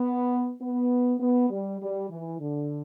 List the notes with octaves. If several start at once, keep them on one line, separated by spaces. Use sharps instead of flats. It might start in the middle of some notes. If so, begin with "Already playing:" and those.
Already playing: B3
B3
B3
G3
G3
E3
D3